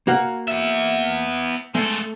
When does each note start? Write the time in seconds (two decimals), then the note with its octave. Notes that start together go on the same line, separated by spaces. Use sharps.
0.07 A#3 F#4 F5
0.48 B3 E5
1.75 G#3 A3 A4